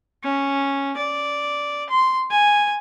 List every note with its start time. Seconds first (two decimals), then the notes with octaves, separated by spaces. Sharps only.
0.24 C#4
0.97 D5
1.90 C6
2.31 G#5